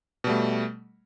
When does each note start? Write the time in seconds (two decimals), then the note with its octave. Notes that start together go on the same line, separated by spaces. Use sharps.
0.24 B2
0.27 G3
0.30 A3